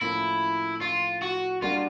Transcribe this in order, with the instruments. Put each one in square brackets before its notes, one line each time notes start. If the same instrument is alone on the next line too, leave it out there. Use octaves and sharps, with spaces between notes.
[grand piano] A2 F3 A#3 C#4 F4 [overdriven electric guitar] E4
[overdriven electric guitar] F4
F#4
[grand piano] G3 A#3 D4 F#4 [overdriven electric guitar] F4